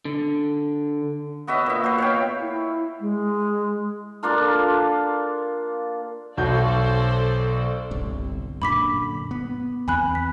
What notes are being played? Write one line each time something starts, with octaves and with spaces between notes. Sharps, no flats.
D3
B3 F#4 D#5 E5
A#2 E5
F#4 B4 C5
C#5 F5 G5
E4
G#3
A#3 D4 F4 A4
B1 F#4 A4 C5 D5 G6
G1 C2 C3
F#2 A#2 D3 B5 D6 B6
B3
E2 E3 C4 G#5 B5 F#6
B6